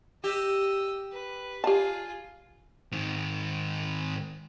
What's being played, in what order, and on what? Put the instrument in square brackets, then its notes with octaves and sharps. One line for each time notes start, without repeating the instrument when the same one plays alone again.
[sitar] G4 [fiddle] D#5 E6
[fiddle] B4
[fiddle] F4 G#4 [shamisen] G4 A5
[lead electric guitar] G#2 D#3